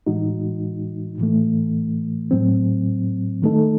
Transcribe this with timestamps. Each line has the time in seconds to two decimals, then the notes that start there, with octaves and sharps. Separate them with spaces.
0.07 A2 E3 G#3 D#4 F#4
1.18 A2 E3 A3
2.31 A2 F#3 C4
3.42 D#3 A3 D#4 A4